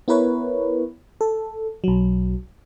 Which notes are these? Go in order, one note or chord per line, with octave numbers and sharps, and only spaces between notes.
B3 E4 A#4 B4 C#5
A4
B1 F#3